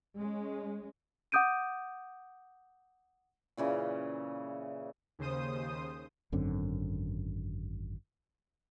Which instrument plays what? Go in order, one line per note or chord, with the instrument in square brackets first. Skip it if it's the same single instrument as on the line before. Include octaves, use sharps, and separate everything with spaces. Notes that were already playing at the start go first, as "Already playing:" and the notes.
[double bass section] G#3 C#4
[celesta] F#5 D6 D#6 G6 D7 D#7
[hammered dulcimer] A#2 C#3 E3
[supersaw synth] D#2 C#3 C5 D#6
[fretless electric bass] G#1 F#2 D3 C4